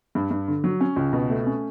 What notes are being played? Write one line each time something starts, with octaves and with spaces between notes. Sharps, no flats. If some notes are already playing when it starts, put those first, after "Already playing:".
G2
G2
D3
F#3
C#4
C#2
B2
A3
C#4